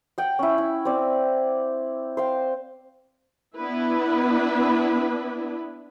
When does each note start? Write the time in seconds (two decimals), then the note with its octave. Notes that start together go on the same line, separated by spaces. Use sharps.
0.18 F#5 G5
0.39 C#4 E4
0.58 E4
0.85 C4 D5
2.17 C5 F5 G5
3.58 B3 D4 E4 B4